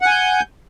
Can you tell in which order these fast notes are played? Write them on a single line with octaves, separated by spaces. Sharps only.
F#5 G#5 G6